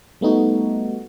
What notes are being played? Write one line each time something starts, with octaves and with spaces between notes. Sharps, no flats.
G3 A3 B3 D#4 F#4